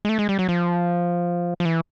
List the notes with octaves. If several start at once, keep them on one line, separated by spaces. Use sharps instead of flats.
G#3
A3
G#3
G3
F#3
F3
F3
E3